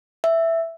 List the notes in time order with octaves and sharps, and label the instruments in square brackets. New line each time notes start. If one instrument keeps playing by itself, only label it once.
[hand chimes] E5